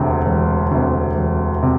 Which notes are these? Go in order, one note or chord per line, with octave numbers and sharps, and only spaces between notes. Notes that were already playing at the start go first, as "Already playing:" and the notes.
Already playing: E1 D2 C3
E1
D2 C3
E1
C3